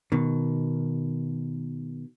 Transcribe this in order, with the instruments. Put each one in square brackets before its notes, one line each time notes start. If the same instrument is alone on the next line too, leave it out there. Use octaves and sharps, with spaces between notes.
[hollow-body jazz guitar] B2 D#3